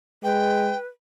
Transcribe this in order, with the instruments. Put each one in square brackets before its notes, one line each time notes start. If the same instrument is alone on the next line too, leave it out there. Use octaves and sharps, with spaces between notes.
[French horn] G#3 [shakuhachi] B4 [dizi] G5